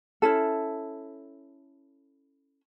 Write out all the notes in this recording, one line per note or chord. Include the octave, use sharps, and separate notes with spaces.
C#4 E4 A4